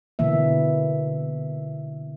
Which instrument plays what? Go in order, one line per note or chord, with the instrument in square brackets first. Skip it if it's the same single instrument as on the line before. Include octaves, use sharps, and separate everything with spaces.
[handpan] B2 D3 E3 A#3 E5